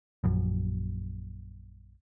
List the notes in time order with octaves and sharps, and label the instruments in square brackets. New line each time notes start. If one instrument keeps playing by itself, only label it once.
[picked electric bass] A#1 F#2